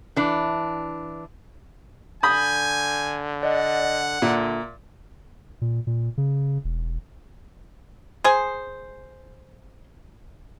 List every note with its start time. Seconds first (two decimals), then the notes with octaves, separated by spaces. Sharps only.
0.16 E3 D4
2.23 D3 G#5 B5 D#6 G6 A#6
3.43 D5 D#5 F#5
4.22 A#2 D3 E5
5.61 A#2
5.87 A#2
6.18 C#3
6.64 E1
8.24 G#4 C5